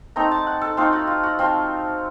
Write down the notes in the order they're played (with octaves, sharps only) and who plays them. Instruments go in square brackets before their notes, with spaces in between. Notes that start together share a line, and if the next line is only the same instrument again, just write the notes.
[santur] A3 C4 D#4 A#5
A5
F#5
A4
A3 C4 D#4 F4
F#4
F4
F#4
F3 C4 F4